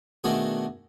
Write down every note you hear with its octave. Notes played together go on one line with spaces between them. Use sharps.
B2 D#3 A3 D4 F#4 G#4